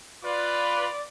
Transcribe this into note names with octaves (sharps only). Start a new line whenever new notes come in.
F4 B4 D5